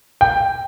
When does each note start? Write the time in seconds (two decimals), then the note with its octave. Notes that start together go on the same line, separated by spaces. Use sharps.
0.21 G5